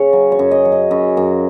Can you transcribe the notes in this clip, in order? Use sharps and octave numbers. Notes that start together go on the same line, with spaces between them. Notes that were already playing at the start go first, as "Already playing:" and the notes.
Already playing: C#3 C#5
F#3
C#5
F#2
D#5
F#3
D#5
F#2
F#2